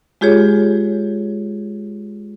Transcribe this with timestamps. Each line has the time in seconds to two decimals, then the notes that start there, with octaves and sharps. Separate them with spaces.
0.21 G#3 F4 G4 G#4 C#5